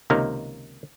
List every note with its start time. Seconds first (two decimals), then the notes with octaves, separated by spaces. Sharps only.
0.10 C#2 C3 D#3 A#3 D#4 A#4